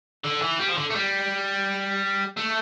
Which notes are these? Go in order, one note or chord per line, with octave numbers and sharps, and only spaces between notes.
D3
E3
G3
F3
D3
A3
G3
A3